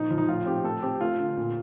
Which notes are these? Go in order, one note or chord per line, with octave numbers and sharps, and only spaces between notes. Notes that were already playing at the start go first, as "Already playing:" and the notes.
Already playing: A#2 F3 D#4
F3
D#4
A2 F4
C4 G4
A3 A4
C4 G4
A3 F4
D3
A#2